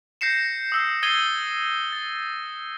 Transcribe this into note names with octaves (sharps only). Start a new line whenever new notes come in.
G6 A#6 C7 C#7 E7
D#6 E6 C7
D#6 G#6 A6 C7 D#7 G7
A6